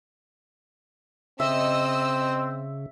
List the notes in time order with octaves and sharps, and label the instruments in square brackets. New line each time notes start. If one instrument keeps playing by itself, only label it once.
[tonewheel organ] C#3 [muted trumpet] C4 [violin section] D#5 E6 [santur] E5